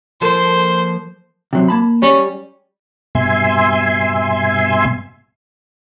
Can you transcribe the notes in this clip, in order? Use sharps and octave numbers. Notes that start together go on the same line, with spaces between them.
F3 A#3 A4 C5
C3 F#3 C4
A#3 A5 B5
G3 C#4
G2 B2 E5 G#5 C6